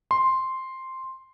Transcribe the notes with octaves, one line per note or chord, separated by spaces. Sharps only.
C6